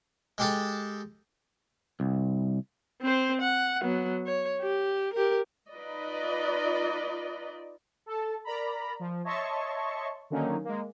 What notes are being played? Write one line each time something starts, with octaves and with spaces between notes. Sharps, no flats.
G#3 G4 A4
C2
C4 C5
F#5
F#3 B3
C#5
G4
G4 A#4
D#4 F4 B4 D5 D#5
A4 A5
A#4 D5 A#5 B5
F3
C#5 D#5 E5 A5 C6 C#6
D3 D#3 F#3 A#3 C#4 D#4
G#3 A#3